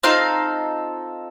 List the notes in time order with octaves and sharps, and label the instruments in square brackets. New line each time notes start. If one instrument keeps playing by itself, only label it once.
[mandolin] C4 D#4 F4 A4 F5